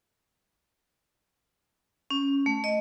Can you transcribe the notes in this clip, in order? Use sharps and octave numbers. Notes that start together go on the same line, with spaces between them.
C#4
A3
D#5